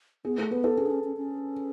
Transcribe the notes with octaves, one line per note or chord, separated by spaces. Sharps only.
B3 G#4
A3 A4
B3 B4
A4
C#4 G#4
D4
C#4
C#4
C#4